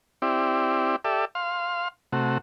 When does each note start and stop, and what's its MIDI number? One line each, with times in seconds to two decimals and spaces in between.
0.22 0.96 60
0.22 0.96 64
0.22 0.96 67
0.22 0.96 74
1.05 1.25 67
1.05 1.25 69
1.05 1.25 74
1.05 1.25 76
1.35 1.88 77
1.35 1.88 84
2.13 2.38 48
2.13 2.38 57
2.13 2.38 66